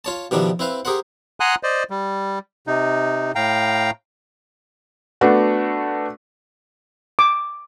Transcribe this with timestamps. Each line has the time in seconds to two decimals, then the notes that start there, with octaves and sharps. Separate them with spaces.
0.05 F4 C#5 A5
0.31 B2 D#3 F3 G3 D4 E4
0.59 C4 E4 B4 F5
0.85 G4 G#4 A#4 C5 F#5
1.40 F#5 G#5 A#5 C6 D#6 F#6
1.63 C5 D5 D#5
1.90 G3
2.67 C3 D#4
3.35 A2 F5 G5 A#5
5.21 A3 B3 D4 F#4
7.19 D6